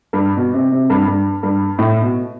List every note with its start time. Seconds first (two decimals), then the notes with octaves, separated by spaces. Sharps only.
0.13 G2
0.37 B2
0.54 C3
0.72 C3
0.90 G2
1.08 G2
1.43 G2
1.79 A2
2.02 B2